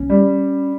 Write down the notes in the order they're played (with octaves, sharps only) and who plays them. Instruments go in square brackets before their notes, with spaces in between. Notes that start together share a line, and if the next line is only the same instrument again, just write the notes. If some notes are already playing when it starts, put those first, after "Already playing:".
Already playing: [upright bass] C#4
[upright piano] G3